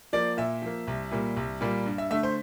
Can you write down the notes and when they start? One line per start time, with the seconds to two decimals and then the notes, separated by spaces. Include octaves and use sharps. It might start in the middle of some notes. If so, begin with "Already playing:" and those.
0.13 F3 A#3 D5
0.37 A#2 E5
0.62 F3 A#3
0.88 C2
1.11 A#2 G3 A#3
1.37 C2
1.61 A#2 G3 A#3
1.86 G2
1.98 E5
2.11 D3 A3 E5
2.23 C5